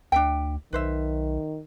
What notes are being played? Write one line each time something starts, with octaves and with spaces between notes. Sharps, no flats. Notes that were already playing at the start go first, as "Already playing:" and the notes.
D2 D4 E5 G5
B1 D#3 B4 C5 E5